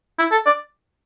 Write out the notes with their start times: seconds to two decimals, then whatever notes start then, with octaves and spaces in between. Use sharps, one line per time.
0.19 E4
0.32 A4
0.46 D5